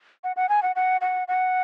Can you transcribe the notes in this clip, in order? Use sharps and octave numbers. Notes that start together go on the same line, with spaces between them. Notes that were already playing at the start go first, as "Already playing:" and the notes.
F#5
F#5
G#5
F#5
F#5
F#5
F#5